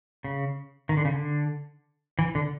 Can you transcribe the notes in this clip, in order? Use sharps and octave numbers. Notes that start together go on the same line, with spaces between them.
C#3
D#3
D3
C#3
D3
E3
D3